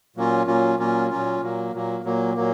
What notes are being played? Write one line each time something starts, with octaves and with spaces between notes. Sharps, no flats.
A#2 F#3 A#3 C#4 F4
A#2 F#3 A#3 C#4 F4
A#2 F#3 A#3 C#4 F4
A#2 F#3 A#3 C#4 F4
A#2 F#3 A#3
A#2 F#3 A#3
A#2 F#3 A#3
A#2 F#3 A#3